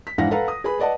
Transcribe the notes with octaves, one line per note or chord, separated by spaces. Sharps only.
B6
G#2 E3 D4 F5 F#5 A#6
A4 B4 F5 F#5 A#5
D#6
G#4 B4 B5
B4 D5 D#5 F#5 A5